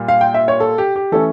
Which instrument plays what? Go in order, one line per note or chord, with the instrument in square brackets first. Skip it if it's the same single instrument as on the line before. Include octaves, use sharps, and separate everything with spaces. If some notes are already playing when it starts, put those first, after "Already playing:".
Already playing: [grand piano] A#2 G3 F4
F5
G5
E5
C#5
A4
G4
G4
E3 A3 C#4 E4 A4